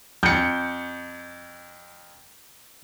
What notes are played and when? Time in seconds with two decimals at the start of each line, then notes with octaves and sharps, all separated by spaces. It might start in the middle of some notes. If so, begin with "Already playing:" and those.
0.23 F2 G6 C#7